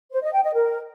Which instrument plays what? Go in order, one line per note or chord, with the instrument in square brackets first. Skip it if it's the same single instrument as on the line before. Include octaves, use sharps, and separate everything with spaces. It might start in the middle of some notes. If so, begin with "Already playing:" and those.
[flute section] C5
D#5
G5
D#5
A#4